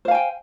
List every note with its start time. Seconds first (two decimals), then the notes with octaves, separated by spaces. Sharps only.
0.05 C5
0.08 F5
0.11 G#5
0.14 G5